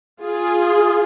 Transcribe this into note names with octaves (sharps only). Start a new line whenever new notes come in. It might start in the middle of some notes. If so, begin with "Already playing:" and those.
F4 G#4